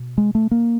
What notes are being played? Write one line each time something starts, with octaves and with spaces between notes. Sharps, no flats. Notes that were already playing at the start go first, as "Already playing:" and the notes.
Already playing: B2
G#3
A3
A#3